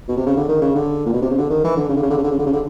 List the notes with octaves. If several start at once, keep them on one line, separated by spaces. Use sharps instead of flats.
B2
C3
C#3
D3
D#3
C#3
D3
A#2
B2
C3
C#3
D3
D#3
E3
D3
C#3
D3
C#3
D3
C#3
D3
C#3
D3
C#3
D3